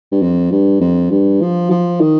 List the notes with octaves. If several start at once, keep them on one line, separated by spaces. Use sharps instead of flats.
G2
F2
G2
F2
G2
F3
F3
D#3